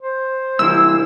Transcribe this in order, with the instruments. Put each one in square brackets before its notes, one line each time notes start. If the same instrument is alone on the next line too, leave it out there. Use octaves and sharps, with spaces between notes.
[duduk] C5
[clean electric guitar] C2 E3 [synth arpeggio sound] E6